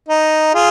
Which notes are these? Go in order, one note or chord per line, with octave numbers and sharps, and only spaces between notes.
D#4
F4 G#4